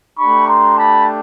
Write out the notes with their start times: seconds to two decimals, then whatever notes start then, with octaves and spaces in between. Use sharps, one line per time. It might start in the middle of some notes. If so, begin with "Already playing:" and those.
0.18 A3 D4 G4 B5 C#6
0.47 A#5 C6
0.76 A5 B5